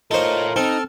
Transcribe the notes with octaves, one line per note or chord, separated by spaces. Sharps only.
D#4 F4 A4 A#4 C5 C#5
C4 D#4 A4 A5 F6